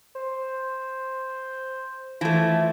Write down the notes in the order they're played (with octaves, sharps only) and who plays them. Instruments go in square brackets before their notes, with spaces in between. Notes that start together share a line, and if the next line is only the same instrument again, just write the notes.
[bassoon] C5
[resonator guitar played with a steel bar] E3 A3 [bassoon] F3